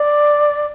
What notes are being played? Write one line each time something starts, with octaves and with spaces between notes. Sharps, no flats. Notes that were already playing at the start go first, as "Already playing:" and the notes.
Already playing: D5